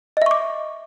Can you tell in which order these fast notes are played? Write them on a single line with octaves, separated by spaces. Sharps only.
D#5 E5 C#6 D6